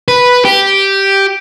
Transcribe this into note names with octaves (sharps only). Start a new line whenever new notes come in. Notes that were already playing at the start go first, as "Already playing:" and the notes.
B4
G4